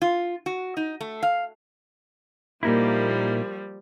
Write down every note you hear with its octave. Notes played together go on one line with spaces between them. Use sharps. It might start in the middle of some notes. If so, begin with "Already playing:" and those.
F4
F#4
D#4
A3
F5
A#2 F3 G3 A#3 D#4 E4